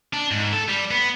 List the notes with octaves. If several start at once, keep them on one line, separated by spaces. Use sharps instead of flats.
D4
G#2
A4
G3
B3